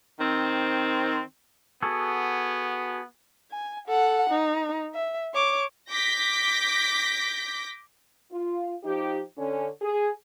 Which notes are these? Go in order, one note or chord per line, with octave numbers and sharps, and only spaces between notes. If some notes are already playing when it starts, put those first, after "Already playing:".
D#3 C4
B3 F#4 G#4 A4
G#5
A4 F#5
D#4
E5
C#5 D6
D6 G6 A#6 B6
F4
F3 D#4 G4
D3 C#4
G#4